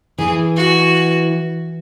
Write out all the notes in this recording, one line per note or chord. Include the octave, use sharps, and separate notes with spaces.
E3 G#4
F#4